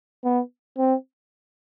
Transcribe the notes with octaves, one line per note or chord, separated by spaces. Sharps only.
B3
C4